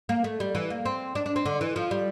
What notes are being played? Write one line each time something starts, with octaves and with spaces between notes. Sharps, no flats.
A#3
A3
G3
E3
A#3
C4
D4
D4
C4
D3
E3
F3
G3